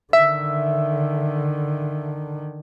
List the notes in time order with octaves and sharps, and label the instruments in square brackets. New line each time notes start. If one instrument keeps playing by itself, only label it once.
[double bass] D3 D#3 [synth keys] E5